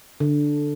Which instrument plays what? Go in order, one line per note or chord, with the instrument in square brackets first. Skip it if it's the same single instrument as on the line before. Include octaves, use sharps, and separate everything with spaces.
[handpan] D3